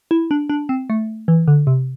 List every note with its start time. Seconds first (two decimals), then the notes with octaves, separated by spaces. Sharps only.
0.11 E4
0.31 D4
0.49 D4
0.69 C4
0.90 A3
1.28 E3
1.48 D3
1.67 C3